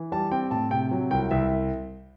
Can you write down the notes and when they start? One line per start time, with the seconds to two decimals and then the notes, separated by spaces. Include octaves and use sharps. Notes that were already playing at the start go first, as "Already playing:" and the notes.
Already playing: E3
0.12 G3 A5
0.32 C4 G5
0.51 A2 A5
0.71 C3 G5
0.91 F#3
1.11 C2 G5
1.31 C2 E5